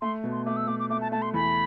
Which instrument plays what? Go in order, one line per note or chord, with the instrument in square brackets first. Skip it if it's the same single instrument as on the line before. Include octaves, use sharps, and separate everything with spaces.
[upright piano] A3 [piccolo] C6
[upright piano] B2
[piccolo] C6
[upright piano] A3 [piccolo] D6
[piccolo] E6
[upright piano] A3 [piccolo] D6
[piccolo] D6
[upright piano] A3 [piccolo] D6
[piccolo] A5
[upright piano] A3 [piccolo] A5
[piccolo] C6
[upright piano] E2 [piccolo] B5